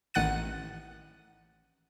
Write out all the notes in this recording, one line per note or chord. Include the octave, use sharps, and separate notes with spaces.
A1 D#3 F#5 F#6 A6 D#7